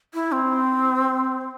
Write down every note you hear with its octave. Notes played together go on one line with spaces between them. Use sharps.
E4
C4